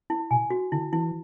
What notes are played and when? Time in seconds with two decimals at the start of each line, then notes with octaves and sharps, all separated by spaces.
0.10 E4
0.31 B2 G#5
0.50 F#4
0.72 D3 E4
0.93 E3 E4